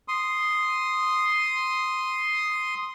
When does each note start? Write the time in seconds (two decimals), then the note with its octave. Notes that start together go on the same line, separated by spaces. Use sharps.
0.08 C6 D#6